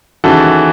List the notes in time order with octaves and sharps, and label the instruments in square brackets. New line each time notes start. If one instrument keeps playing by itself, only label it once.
[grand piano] D#2 C#3 E3 F#4 A4